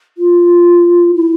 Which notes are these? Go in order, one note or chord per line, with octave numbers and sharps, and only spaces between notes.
F4
E4